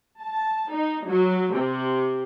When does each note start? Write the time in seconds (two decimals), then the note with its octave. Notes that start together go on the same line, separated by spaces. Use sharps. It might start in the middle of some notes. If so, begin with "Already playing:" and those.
0.22 A5
0.70 D#4
1.06 F#3
1.52 C3